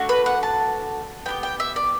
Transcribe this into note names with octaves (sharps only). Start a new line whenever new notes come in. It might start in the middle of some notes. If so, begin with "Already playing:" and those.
Already playing: A3 D4 F#4
B4
F#5
A5
B3 E4 G4 G5
G5
E5
D5